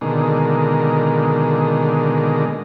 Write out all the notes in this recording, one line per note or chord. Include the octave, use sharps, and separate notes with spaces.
B2 D3 D#3 G#3 A#3